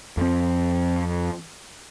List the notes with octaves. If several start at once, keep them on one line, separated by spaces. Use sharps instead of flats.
F2 F3 C4